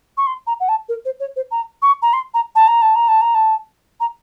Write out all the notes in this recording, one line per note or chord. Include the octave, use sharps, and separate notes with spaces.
C#6
C6
A#5
F#5
A5
A#4
C5
C#5
C5
A#5
C#6
A#5
C6
A#5
A5
A#5
A5
A#5
A5
A#5
A5
A#5